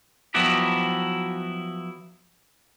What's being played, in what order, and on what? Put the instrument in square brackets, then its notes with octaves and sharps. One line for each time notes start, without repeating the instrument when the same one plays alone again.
[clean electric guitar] F3 F#3 B3 E4 F#4 G4